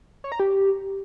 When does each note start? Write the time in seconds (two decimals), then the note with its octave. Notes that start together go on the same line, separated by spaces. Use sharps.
0.24 C#5
0.32 A#5
0.40 G4